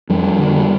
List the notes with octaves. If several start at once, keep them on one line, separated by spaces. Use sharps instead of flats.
F2 G3
D3